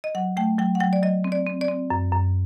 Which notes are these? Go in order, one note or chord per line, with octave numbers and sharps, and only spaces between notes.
D#5
F#3 F#5
A3 G5
F#3 G5
F#5
F#3 G5
D5
F#3 D#5
C4
D5
C4
D5
C4
F#2
F#2